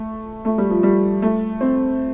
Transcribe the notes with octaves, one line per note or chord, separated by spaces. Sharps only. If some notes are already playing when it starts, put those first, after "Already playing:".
Already playing: A3
A3
G3
F3
G3
A3
C4